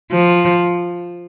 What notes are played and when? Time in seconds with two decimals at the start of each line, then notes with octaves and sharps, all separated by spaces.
0.12 F3